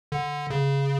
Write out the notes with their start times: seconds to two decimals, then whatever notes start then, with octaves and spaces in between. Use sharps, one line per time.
0.12 D3
0.50 C#3